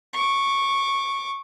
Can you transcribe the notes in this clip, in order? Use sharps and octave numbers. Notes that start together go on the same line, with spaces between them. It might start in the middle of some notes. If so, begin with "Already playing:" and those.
C#6 D6